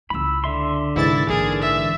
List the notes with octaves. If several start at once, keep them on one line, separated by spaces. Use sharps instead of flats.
C#2 E4 B5 E6
D3 E5 C6
E2 G#2 C3 E3 E4 A6
A#1 D3 G#4 A#4
E5